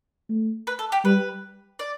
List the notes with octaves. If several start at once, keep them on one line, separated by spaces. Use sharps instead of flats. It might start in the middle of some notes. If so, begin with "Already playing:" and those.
A3
B4
A4
G4
G3 B4
D5